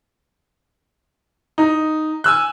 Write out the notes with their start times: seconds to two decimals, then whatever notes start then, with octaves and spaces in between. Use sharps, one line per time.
1.58 D#4
2.24 G#5 E6 F#6